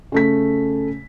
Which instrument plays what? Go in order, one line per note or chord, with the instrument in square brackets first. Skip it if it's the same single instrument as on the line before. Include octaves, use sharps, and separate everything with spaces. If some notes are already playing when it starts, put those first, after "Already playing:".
[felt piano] C#3 A3 B6